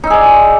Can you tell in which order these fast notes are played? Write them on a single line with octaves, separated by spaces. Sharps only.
D#4 E5 G#4 D5